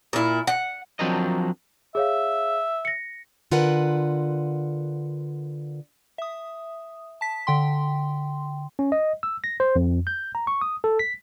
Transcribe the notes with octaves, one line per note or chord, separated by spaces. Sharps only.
A#2 E4
F#5
F3 F#3 C4 D4 A#4 D#5
G#4 C#5 E5 F5
A#6 C#7
D3 F4 A#4 B4 F#5
E5 D#6
A5 B6
D3 G5 C6
C#4
D#5
E6
A#6
C5
F2
G6
A#5
C#6
D#6
A4
B6